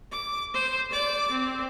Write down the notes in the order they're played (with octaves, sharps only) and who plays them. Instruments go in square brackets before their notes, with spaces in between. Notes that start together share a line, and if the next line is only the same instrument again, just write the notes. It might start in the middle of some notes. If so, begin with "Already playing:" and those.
[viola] D6
C5
D5 D6
C4